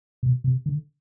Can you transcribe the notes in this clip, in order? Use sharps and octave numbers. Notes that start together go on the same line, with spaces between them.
B2
C3
D3